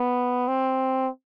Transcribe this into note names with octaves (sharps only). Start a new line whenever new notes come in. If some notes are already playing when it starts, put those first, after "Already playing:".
Already playing: B3
C4